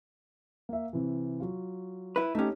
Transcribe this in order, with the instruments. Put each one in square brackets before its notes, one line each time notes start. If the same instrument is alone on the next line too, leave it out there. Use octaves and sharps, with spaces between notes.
[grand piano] A#3 E5
C3 E3
F#3 F4
[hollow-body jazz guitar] E4 B4
[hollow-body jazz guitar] A3 C#4 [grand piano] D#4 G4